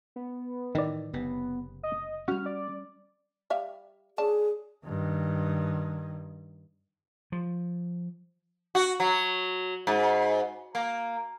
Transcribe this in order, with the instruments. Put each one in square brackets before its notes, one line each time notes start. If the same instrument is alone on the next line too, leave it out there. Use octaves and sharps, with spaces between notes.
[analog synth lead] B3
[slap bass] A2 E3 [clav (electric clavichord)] D#3 D5
[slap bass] F#1 C3 [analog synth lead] B3
[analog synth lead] D#5
[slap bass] G3 C#4 [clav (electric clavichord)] F#4 [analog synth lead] F6
[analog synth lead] D5
[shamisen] G3 E5 F5
[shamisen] C#4 D4 A5 [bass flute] G#4
[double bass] G2 D#3
[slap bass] F3
[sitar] F#4
F#3
G#2
A#3